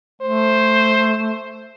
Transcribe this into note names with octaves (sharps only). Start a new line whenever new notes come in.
A3 C5